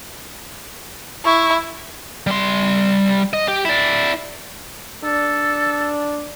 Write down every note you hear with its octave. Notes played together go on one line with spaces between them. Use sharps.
E4 C#6
G3 C6
D#5
G4
E4 D5
D4 A4